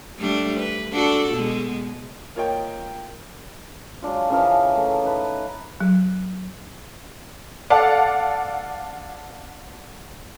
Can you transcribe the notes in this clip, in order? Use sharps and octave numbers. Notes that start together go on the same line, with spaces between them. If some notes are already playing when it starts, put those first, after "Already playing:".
G3 A3 D4
B4
D4 F#4 A4
B2 G#3
A#3 F4 A#4 C#5 D#5 G5
F#3 G#3 D4 F4
C#3 E3 F3 A#4
A3
D#4 B4
F#3
A4 D5 F5 F#5 A5